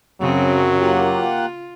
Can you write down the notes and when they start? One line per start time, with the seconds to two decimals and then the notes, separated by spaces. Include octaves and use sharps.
0.21 F#2 C#3 F#3 C4
0.80 A#3 F4 G4 F#5